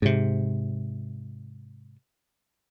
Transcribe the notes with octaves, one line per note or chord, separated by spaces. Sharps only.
G#2 C3